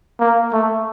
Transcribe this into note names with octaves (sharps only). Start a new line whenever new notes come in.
A#3
A3